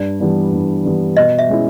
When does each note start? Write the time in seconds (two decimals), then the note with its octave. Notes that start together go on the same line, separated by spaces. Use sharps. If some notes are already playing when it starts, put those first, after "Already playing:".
Already playing: G2 D5
0.20 E3 G3 B3 D4
0.52 G2
0.85 E3 G3 B3 D4
1.17 B2 D#5
1.39 E5
1.49 G#3 C#4 E4